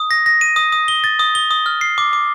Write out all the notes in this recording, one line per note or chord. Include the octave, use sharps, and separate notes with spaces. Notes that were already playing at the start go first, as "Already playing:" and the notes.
Already playing: D#6
A#6
A#6
D#7
D#6
D#6
G7
A6
D#6
G7
D#6
F6
C7
D6
D6